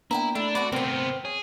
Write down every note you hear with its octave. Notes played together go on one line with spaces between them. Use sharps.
A#3 B3 D4 E4 G5 G#5 A#5
A3 D4 E4
B3 C4 F#4 D5 A5
C3 B3 C4 A#4 C5
G#4 C#5